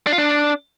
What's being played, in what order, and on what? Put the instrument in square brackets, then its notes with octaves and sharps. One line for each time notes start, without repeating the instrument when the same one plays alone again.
[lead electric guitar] D4
F4
D4